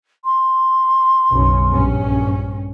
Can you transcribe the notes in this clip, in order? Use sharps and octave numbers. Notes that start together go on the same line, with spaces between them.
C6
F#1 B1 C#4
A#1 G2 C#4